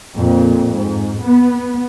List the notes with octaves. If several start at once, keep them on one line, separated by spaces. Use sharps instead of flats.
F2 A#2
G#2
B3